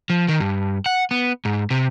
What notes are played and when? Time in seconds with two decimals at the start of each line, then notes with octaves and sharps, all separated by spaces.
0.10 F3
0.29 D#3
0.40 G2
0.86 F#5
1.11 B3
1.45 G#2
1.71 C3